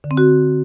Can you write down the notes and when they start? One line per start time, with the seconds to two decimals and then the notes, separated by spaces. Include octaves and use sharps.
0.04 D3
0.11 C4
0.17 F#4